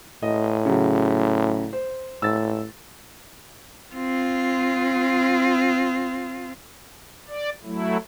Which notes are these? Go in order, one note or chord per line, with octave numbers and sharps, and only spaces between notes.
A2 D#5
C#3 F#3
C5
A2 E6 A6
C4 F4
D5
F#3 A3 E4